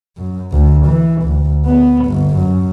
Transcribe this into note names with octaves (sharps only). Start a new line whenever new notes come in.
F#2
D2
E3
D2
B3
G1
F#2